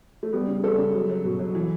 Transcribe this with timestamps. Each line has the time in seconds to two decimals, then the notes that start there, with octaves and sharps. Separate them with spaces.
0.23 A3
0.33 G3 B3
0.48 C#3
0.64 G3 A4
0.78 C#3
0.93 F#3
1.10 F#3
1.24 B2
1.39 F#3
1.55 E3